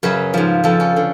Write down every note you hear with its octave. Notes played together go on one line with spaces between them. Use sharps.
F#2 C#3 F#3 B4
G#2 F3
F2 F3 A4
C#4
D3